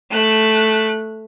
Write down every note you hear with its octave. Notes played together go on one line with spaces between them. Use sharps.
A3 F#6